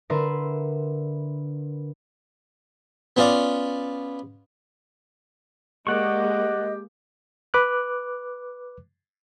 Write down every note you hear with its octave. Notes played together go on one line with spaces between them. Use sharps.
D3 A#4 B4 E5 C6
B3 C#4 F4 D5 F5
G#3 A#3 G4 D5 D#5 F#5 C#6
B4 D6 F#6